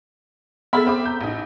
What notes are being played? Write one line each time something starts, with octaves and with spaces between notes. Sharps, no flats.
B3 G#4 A4 E5 B5 F6
C4 E5 D6
A#5 G6
A1 D#4